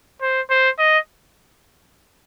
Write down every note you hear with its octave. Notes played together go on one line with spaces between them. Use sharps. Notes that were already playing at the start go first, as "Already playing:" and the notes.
C5
C5
D#5